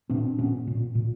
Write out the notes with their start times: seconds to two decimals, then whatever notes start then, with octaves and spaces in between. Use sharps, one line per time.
0.09 A#2 C4 D4
0.39 A#2 B3 C#4
0.67 A#2
0.95 A#2